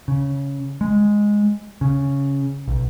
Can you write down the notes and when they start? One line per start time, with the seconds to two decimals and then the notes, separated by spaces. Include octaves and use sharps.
0.08 C#3
0.81 G#3
1.81 C#3
2.68 B1